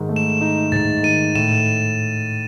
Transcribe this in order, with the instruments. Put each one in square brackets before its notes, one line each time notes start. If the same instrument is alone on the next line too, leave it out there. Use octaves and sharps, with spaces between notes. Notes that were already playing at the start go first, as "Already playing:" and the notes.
Already playing: [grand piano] G#2 D#3
A3
[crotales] E7
[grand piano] D#4
[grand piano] G#2 [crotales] A6
[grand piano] D#3 [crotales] D#7
[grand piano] A2 [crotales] E7